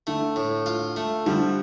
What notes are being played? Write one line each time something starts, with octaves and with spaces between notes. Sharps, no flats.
D3 A3
A2
F4
A3
D3 F3 G3